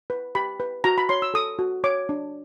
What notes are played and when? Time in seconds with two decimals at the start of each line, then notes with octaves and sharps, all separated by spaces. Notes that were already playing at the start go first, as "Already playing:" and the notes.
0.10 B4
0.35 G4 B5
0.60 B4
0.84 F#4 A#5
0.98 B5
1.09 C#5 C6
1.22 E6
1.34 A4 D#6
1.59 F#4
1.84 C#5 D6
2.09 D4